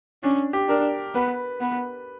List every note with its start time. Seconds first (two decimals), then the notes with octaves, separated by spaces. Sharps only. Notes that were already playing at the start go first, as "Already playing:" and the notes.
0.23 C#4 D4
0.53 G4
0.68 D4 A#4
1.14 B3 B4
1.60 B3